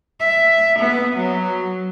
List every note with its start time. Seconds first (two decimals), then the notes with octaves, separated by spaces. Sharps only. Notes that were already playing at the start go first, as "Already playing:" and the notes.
0.20 E5
0.79 B3
1.17 F#3